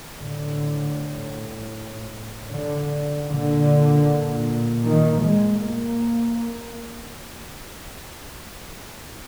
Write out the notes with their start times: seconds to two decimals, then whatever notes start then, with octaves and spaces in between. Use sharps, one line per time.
0.16 A2 D3
2.50 D3
3.29 A#2 D3
4.85 D#3
5.24 G#3
5.63 A#3